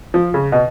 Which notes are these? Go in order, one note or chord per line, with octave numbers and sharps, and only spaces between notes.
F3
C#3
B2